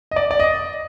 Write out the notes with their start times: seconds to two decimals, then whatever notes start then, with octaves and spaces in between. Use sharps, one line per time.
0.11 D#5
0.16 D5
0.31 D5
0.40 D#5